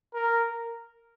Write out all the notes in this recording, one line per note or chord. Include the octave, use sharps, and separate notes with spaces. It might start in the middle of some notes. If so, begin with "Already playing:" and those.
A#4